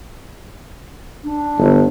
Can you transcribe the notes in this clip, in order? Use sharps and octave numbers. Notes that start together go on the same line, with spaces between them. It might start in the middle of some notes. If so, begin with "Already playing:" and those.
D4
G1